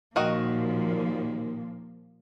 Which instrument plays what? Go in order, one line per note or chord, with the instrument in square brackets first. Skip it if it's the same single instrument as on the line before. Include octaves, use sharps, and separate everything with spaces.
[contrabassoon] D#2 [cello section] A#2 F3 [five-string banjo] D#3 F#4 D#5 [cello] A#3